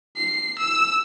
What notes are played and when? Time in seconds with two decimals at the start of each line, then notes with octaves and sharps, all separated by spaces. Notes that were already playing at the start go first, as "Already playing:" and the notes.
0.17 C7
0.59 E6